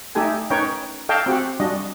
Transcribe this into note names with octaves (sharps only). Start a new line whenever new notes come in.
A3 D#4 G4 A4 G#5
C#4 D#4 A#4 B4 C#5 G5
A4 D#5 F5 G5 A5
C4 F#4 G4 F#5
G3 D4 F#4 D#5